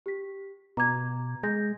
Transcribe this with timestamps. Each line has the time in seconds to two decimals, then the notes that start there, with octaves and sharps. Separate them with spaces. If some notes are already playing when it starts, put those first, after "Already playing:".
0.06 G4 B6
0.77 B2 A#5 D6 G#6
1.43 G#3 G6 A#6